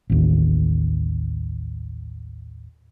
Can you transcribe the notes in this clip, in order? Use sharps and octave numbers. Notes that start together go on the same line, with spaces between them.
A1 D#2